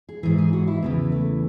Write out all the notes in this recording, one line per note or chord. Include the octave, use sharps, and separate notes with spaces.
G#4
G#2 E3 G#4
G#4
F#4
E4
E2 C#3 E3 B3
A3